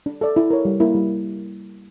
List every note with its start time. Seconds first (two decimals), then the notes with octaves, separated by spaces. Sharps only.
0.06 D4
0.21 A4 D5
0.36 E4
0.51 A#4 C#5
0.65 G3
0.80 A#3 E4 A#4
0.95 G3